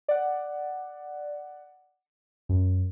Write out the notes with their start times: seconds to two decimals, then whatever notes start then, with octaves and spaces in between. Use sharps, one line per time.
0.08 D5 F#5
2.49 F#2